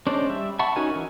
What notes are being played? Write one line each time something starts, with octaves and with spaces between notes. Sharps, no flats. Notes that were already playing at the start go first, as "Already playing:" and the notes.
G#3 C#4 D4 C5 D5
G3 E5
E5 F#5 A5 B5 C#6
C#4 D#4 F#4 A#4 G#5
E3